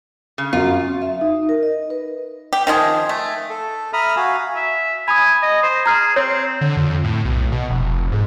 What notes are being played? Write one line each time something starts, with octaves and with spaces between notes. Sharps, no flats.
C#3
F#2 F#3 F4
E5
D#4
A#4
D#5
B4
G4
D#3 F3 E4 G#4
A3
A4
E5 A#5 B5 D#6 F6
F#4 F5 G#5
E5
G#5 B5 D#6
D#5
C5
G#4 A#5 F6
C4 C#5
D3
F2
A2
B1
B2
F1
G#2